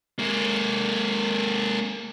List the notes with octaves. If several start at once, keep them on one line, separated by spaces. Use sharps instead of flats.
G#3 A#3